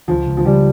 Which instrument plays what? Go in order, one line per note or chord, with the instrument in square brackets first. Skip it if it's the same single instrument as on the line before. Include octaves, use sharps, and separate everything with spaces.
[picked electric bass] C#2 [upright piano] F3
[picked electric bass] C#2
[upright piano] F3
[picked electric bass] C#3 [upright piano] G3